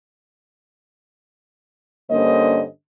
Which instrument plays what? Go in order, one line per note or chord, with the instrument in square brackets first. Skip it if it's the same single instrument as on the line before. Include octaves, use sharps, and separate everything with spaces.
[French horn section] G2 D3 A#3 C#4 C5 D#5